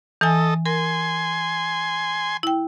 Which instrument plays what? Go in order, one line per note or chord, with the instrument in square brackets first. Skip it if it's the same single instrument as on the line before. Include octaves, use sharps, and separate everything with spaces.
[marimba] E3 G#5 [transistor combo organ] A4 D#5
[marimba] A#4 [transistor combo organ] G#5 C6
[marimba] E4 G5